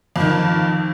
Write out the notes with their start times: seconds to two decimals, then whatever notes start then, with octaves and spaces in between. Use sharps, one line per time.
0.16 F2 D#3